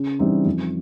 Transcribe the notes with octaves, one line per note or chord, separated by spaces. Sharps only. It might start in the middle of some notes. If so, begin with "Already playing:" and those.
Already playing: C#3
E3 G3 C4 D#4
F2